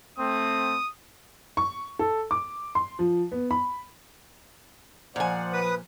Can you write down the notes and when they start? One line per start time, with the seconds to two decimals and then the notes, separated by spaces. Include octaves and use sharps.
0.18 A3 C4 D#6
1.57 C#6
1.99 A4
2.31 D6
2.75 C6
2.99 F3
3.32 B3
3.51 B5
5.16 A#2 F3 C5 D5 F#5 G#5
5.53 B4 D#6